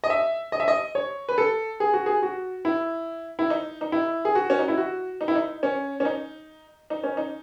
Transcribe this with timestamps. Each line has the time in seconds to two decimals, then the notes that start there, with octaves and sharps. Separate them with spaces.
0.04 D#5
0.10 E5
0.52 D#5
0.60 E5
0.68 D#5
0.95 C#5
1.29 B4
1.38 A4
1.80 G#4
1.93 F#4
2.06 G#4
2.22 F#4
2.65 E4
3.39 E4
3.50 D#4
3.81 D#4
3.92 E4
4.25 G#4
4.35 F#4
4.50 C#4
4.59 D#4
4.68 E4
4.77 F#4
5.21 D#4
5.28 E4
5.36 D#4
5.63 C#4
6.00 C#4
6.05 D#4
6.90 D#4
7.04 C#4
7.17 D#4